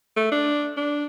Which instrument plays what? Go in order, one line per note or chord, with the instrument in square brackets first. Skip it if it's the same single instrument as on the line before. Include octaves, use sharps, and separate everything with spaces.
[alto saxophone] A3
D4
D4